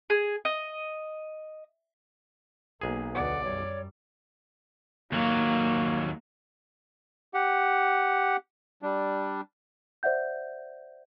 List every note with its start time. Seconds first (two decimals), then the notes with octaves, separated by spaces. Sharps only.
0.10 G#4
0.45 D#5
2.81 B1 A#3 G#4
3.15 D2 B3 D5 F#5
3.44 F#2 G3 C#5
5.12 D#2 F#3 A#3
7.34 G4 F#5
8.82 G3 D4
10.03 C5 D5 E5 F#5 G6